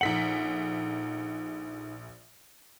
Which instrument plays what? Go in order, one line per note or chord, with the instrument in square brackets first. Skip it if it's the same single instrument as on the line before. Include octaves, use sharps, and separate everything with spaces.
[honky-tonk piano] A#1 B6 F#7 [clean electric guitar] D#4 A4 F#5